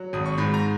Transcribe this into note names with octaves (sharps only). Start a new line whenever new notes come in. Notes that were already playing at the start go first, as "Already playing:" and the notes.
Already playing: F#3
G#1 D#6
C#6
G#2 B5
A#5